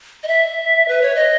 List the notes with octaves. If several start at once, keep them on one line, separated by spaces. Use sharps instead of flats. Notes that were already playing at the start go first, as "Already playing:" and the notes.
D#5
E5
B4
C#5
D#5